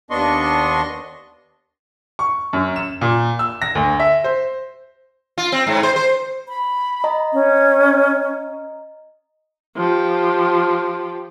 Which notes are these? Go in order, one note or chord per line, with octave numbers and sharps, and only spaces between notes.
D#2 B3 D4 D#5 C6 C#6
C#6
F#2
E7
A#2
E6
A#6
D2
E5
C5
F4
C4
G#2
C5
C5
B5
D#5 A#5
C#4
F3 G4